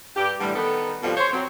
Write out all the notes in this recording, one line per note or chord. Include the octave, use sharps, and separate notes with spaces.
G2 G4
A2 D3 E3 G3
D#3 B3 A4
F2 B2 F3 G3 F4 A4
C5 C#5
F#3 C4